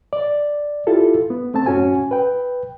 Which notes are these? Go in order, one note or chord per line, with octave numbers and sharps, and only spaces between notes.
D5
E4 F4 G4 A4
B3
A3 C4 A5
F#2 C#4 F#4 G#5
B4 G5